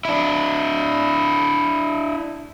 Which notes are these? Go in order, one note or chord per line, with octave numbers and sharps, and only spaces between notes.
D4 E4